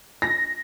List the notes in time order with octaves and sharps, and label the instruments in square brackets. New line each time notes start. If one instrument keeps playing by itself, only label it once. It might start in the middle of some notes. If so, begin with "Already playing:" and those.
[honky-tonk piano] A#6